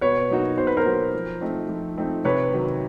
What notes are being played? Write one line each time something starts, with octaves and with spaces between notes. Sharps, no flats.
B2 B4 C#5
F#3 A#3 D#4 F#4
B2 C5
B4
A#4 C5
F#3 A#3 D#4 F#4
F3
A3 C4 D#4
F3
A3 C4 D#4
C3 B4 C#5
D#3 F#3